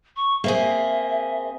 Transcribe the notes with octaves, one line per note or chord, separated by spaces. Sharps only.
C#6
A#3 C4 G#4 E5